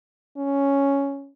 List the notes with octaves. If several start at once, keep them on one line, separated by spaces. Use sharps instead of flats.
C#4